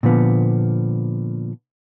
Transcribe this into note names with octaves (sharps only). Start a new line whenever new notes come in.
A#2 D3 F3 B3